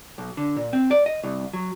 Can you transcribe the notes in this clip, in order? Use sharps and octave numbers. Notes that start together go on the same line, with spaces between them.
B1
D3
A#2
C4
D5
D#5
C2
F#3